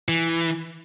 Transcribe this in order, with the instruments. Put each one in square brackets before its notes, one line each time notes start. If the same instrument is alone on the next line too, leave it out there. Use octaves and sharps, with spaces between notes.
[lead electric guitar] E3